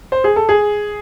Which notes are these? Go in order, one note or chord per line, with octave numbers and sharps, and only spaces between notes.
C5
G#4
A4
G#4